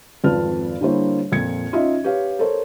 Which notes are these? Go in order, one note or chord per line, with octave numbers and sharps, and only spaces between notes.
G#1 F2 F4 B4 A5 F6
D3 G3 A#3 E4 C5 C#5
F2 A#2 G#6 C#7
C#4 D#4 F4 D#5 E5
G4 B4 C#5 F5
A4 A#4 C5 C#5